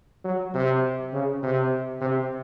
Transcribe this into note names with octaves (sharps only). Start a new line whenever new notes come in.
F#3
C3
C#3
C3
C3